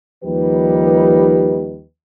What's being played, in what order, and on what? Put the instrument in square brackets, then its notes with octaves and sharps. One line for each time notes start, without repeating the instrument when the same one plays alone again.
[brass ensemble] D#2 F3 G3 D#4 G4 B4